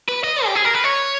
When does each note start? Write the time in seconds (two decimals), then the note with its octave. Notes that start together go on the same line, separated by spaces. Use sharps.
0.08 B4
0.24 D#5
0.45 G4
0.55 G#4
0.64 A#4
0.74 B4
0.84 C#5